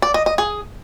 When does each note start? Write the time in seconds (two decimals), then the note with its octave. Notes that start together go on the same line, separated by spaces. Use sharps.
0.02 D5
0.14 D#5
0.26 D#5
0.38 G#4